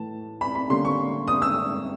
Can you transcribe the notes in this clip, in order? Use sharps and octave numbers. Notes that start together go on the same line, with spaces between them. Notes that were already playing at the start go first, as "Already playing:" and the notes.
Already playing: A2 E3 A3 A5
B5
B5
D3 G3 A#3 C#4 C6
C#6
D#6
E6